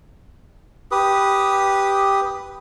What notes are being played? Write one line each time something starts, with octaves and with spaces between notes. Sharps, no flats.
G4 B4 D#6